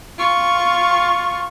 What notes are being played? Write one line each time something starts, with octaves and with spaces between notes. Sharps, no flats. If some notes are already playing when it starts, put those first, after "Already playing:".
F4 C#6